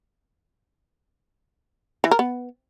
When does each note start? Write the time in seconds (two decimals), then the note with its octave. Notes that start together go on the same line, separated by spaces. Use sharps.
2.04 E3
2.11 A#4
2.19 B3